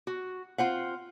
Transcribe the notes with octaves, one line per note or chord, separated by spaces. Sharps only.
F#4
C4 F4 C5 F#5